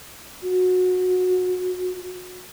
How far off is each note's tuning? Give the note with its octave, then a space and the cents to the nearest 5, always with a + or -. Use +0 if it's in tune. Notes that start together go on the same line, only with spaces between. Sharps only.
F#4 -20